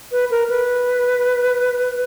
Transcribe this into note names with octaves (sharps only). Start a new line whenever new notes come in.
B4
A#4
B4